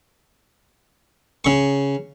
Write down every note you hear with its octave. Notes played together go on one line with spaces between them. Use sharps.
C#3 C#6